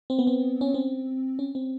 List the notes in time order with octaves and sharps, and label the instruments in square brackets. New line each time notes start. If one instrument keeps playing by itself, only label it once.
[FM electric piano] C4
B3
C4
C#4
C4
C#4
C4